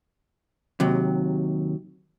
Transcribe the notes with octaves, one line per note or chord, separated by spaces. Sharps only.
D#2 C3 F#3